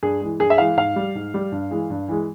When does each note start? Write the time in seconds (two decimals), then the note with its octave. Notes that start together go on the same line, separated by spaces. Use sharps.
0.03 G2 G#4
0.21 E3 G#3
0.39 G2 G#4
0.50 E5
0.58 E3 G#3 F5
0.77 G#2 F5
0.96 G3
1.15 G#2
1.34 G3
1.52 G2
1.71 E3 G#3
1.90 G2
2.08 E3 G#3